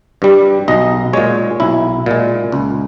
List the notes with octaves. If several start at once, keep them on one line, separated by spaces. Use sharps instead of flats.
G2 G3
B1 D#5
A#2 G#3 C#5
B1 E4
A#2 G#3
C#2